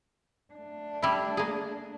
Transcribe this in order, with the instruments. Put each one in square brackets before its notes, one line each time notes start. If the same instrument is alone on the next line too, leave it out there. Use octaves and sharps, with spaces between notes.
[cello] A3 D4
[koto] G3 E4
A#3 G#4